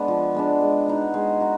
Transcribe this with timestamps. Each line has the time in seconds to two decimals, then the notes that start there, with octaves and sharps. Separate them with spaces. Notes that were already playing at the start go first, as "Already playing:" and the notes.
Already playing: G#3 B3 D4
0.08 F3
0.35 G#3 B3 D4
0.61 G#3
0.88 B3 D#4 F#4
1.14 G#3
1.40 D#4 F#4